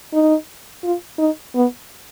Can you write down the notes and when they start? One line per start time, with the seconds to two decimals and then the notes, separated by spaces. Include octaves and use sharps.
0.14 D#4
0.83 F4
1.18 D#4
1.54 B3